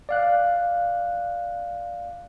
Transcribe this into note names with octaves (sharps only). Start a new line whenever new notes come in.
D5 F5 F#6